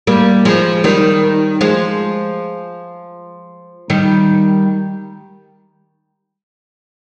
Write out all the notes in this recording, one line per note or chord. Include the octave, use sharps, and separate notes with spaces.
G3 A#3
F3 G#3
D#3 G3
F3 G#3
D#3 G3